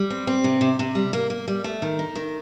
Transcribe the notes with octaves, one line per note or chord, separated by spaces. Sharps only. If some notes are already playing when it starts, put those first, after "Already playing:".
Already playing: G3
C4
C4
C3
C3
C3
G3
A#3
A#3
G3
A3
D#3
D#4
D#3